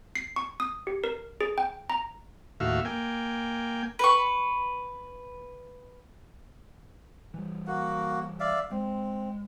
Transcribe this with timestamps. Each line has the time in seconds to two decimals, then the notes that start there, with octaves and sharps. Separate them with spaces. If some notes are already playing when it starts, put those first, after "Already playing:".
0.15 C7
0.36 C#6
0.60 D#6
0.87 G4
1.04 A#4
1.41 G#4
1.58 G5
1.90 A#5
2.60 D#2 A2 F#4 E5 F5
2.85 A#3 G5 G#5
3.99 B4 C#6
7.34 E3 G3
7.67 A#3 F#4 F#5
8.40 D5 E5 F5
8.71 G#3 C4